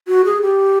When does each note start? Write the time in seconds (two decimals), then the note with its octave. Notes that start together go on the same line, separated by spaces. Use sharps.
0.08 F#4
0.25 G#4
0.42 G4